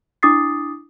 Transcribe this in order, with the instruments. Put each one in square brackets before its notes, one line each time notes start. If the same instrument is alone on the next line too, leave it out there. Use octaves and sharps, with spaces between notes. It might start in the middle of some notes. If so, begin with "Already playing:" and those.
[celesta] D4 E4 D6 D#6 A6 C7